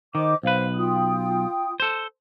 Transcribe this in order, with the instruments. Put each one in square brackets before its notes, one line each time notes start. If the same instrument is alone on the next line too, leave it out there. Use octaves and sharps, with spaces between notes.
[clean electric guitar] D#3 [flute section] C5 D#5 D6
[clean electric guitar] B1 B4 [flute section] C5 F5
[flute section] F4 G5 D#6
[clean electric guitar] A4 C5